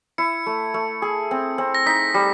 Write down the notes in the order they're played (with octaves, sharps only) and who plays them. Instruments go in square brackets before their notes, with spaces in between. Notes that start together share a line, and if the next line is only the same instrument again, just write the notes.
[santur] E4 [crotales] C#7
[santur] A3
A3
G#4
C4
C4
[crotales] A#6
[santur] D#4 [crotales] B6
[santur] G3